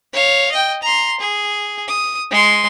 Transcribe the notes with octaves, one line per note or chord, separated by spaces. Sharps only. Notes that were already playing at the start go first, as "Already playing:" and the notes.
C#5 F5
D#5 G5
A#5 C6
G#4
D#6
G#3 C6